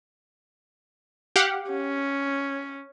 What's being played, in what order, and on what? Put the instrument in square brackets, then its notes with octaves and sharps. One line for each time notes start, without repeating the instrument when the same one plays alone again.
[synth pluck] G4 F5 F#5
[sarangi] C#4